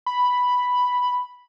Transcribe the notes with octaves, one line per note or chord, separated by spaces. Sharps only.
B5